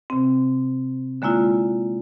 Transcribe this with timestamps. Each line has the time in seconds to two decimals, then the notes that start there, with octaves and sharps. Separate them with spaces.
0.10 C3 C4
1.22 D3 G#3 A#3 E4 F4